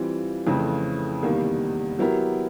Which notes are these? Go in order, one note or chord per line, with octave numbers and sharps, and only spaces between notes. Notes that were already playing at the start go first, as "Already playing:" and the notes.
Already playing: E3 G3 C4 F4
F2 C#3 E3 A3 C4
E2 C3 D#3 G3 A#3
F#3 B3 E4 G4 A#4